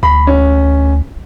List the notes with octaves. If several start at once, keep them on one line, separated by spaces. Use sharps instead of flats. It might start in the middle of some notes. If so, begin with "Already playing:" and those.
D2 B5
C#4